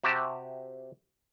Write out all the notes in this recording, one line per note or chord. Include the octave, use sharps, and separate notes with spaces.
C3 F#4 G4 E5 A5